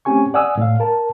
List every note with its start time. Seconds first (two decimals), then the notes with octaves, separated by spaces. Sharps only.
0.05 A3 C4 C#4 G4 G#5 C#6
0.34 D5 F#5 G#5 D#6 E6
0.57 A2 F5
0.80 A#4 A5